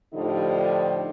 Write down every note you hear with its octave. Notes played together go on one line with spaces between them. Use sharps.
A2 D3 F3 G3 D#4